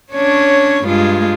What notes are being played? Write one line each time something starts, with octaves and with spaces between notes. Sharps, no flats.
C#4 D4 C#5
G2 G#3 F4